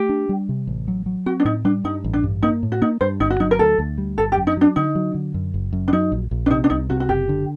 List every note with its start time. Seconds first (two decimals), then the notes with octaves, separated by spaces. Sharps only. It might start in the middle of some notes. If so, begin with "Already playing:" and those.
Already playing: A3 G4
0.09 D4
0.29 G3
0.49 C3
0.67 A1
0.88 F#3
1.06 F#3
1.26 C4 F#4
1.40 D4
1.45 A2 D#4
1.65 G3 D4
1.84 G2 D#4
2.04 A1
2.14 D4
2.24 G2
2.43 A#3 D#4
2.63 A2
2.72 F#4
2.82 A#3 D#4
3.01 G2 C5
3.20 G1 D#4
3.30 F#4
3.40 F#3 D#4
3.51 A#4
3.59 D2 A4
3.79 D2
3.98 G3
4.18 G1 A4
4.32 G4
4.37 F#2
4.47 D#4
4.57 F#3 D4
4.76 D3 D#4
4.95 F#3
5.15 D3
5.34 F#2
5.54 F#1
5.73 F#2
5.88 D4
5.93 F#3 D#4
6.12 A#1
6.31 A#1
6.46 D4
6.51 C3 D#4
6.64 D4
6.70 C2 D#4
6.90 C3 F#4
7.00 F#4
7.09 F#1 G4
7.29 D3